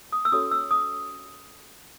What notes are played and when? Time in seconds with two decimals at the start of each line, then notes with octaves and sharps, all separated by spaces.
0.12 D#6
0.25 E6
0.32 C#4 F#4 A4 C#5 D#6
0.51 E6
0.71 D#6